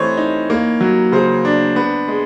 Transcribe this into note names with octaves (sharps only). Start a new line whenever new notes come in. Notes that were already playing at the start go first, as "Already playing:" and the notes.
Already playing: E3 A3 C4 C5 C#5 D#5
D#4
A#3
F#3
C#3 C5
D4
B3
G#3